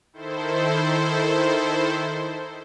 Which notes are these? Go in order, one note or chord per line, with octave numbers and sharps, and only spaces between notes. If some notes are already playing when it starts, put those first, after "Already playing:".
D#3 E4 A4 C5